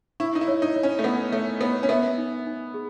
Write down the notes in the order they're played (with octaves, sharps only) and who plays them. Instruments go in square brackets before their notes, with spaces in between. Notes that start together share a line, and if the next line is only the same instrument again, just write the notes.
[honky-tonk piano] E4 [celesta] C#6
[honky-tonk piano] D#4
E4
[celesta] C#5
[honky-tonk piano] D#4
[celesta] C#5
[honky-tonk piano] C#4
A3
[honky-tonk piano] B3 [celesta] F#5
[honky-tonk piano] A3 [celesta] C#5
[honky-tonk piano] B3 [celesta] C#5
[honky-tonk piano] C#4
[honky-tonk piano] B3 [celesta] E5
[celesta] D#4
D#4
G#4